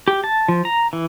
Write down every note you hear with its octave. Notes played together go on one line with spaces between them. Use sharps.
G4
A5
F3
A#5
E3